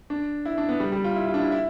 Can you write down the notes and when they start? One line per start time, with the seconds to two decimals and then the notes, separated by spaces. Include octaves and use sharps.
0.10 D4
0.45 E4
0.58 D4
0.69 B3
0.80 G3
0.92 G3
1.04 F4
1.15 E4
1.28 F4
1.34 D4
1.39 E4
1.52 E4